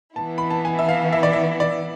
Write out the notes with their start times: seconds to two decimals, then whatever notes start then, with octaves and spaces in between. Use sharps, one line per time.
0.16 E3 B3 E4 A5
0.38 B5
0.50 A5
0.65 G#5
0.79 E5
0.89 F5
1.13 E5
1.23 D5
1.33 E5
1.60 D5